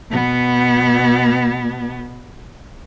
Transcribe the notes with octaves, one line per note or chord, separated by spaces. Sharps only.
B2 B3